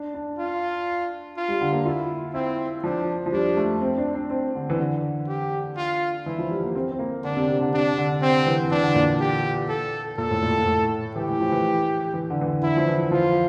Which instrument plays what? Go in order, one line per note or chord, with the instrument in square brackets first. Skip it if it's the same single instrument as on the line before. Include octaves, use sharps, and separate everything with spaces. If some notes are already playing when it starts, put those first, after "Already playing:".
Already playing: [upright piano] D4
D4
[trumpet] F4
F4
[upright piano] G3
D3
A#3
[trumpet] E4 [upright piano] F4
[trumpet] C4 [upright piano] E4
[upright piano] F3 [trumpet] D4
[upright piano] F3
[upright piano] G3 [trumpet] D4
[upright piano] A3
C4
D4
D4
C4
D3
E3
D3
[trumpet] G4
F4
[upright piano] E3 [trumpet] E4
[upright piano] F3
G3
A#3
C4
C4
A#3
[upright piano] D3 [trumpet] D4
[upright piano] C3
C3
D3
[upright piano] C3 [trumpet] D4
[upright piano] D3
[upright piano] C3 [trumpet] C4
[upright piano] E3
[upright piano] E3 [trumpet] D4
[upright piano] D3
A#2
[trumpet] G4
A4
[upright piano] A#2 [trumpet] A4
[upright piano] A2
A#2
A#2
A2
[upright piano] E3 [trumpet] G4
[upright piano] E3
F3
E3
E3
D3
E3
D3
[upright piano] D3 [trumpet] E4
[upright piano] F3
E3
[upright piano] F3 [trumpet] F4